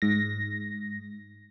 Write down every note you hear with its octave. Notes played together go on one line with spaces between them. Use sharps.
G#2 A#6